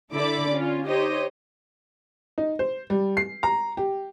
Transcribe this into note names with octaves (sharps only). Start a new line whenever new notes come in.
D3 E4 A4 D5 B5 D6
C#4 F4
D#4 G4 C5 C#5 D#5
D#4
C5
G3
C7
A#5
G4